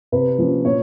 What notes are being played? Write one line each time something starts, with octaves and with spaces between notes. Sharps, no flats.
C3 B4
F3 A#3 C#4
A#2 C#5